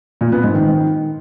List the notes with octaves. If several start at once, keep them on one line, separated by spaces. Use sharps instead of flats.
A#2
B3
G#2
D#3